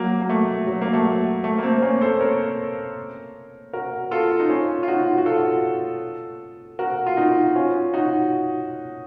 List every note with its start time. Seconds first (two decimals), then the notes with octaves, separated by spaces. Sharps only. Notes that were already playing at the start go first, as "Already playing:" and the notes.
Already playing: F#3 A#3
0.22 A#3
0.30 A3
0.67 F#3
0.81 A#3
0.93 A3
1.06 F#3
1.44 A3
1.58 A#3
1.63 A3 C4
1.82 A#3 C#4
2.01 A4 C5
2.21 A#4 C#5
3.73 F#4 A#4
4.11 F4 A4
4.40 D#4
4.50 C#4 F4
4.83 F4
4.88 D#4 F#4
5.18 F#4
5.26 F4 A4
6.79 F#4 A#4
7.06 F4
7.17 D#4 F#4
7.55 C#4 F4
7.94 D#4 F#4